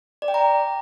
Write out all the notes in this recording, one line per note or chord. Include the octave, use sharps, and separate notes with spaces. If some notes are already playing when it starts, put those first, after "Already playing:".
D5
G5
A#5